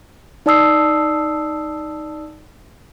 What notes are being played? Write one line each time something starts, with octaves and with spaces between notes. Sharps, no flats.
D#4 D5 A5 D#6 E6 C7